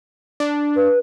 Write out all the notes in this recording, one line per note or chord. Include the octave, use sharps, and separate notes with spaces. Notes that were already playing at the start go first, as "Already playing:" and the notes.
D4
B4